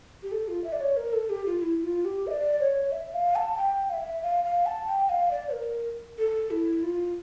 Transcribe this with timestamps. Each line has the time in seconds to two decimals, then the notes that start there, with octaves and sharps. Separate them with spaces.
0.23 G4
0.32 A4
0.48 F4
0.64 E5
0.72 D5
0.80 C#5
0.97 A#4
1.13 A4
1.30 G4
1.46 F4
1.62 E4
1.84 F4
2.05 G4
2.27 E5
2.31 D5
2.60 C#5
2.92 E5
3.14 F5
3.35 A5
3.57 G5
3.90 F5
3.93 E5
4.23 F5
4.44 F5
4.66 A5
4.87 G5
5.09 F5
5.31 D5
5.53 A#4
6.18 A4
6.51 E4
6.83 F4